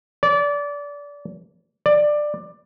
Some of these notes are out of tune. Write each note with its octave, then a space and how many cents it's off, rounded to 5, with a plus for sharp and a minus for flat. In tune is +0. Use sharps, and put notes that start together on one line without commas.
D5 -25
D5 +15